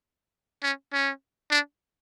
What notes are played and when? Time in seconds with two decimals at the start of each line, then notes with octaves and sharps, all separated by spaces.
0.63 C#4
0.93 C#4
1.51 D4